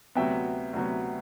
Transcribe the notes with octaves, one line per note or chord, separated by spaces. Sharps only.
D2 C3 F#3 B3 E5 G5
D2 C3 F#3 B3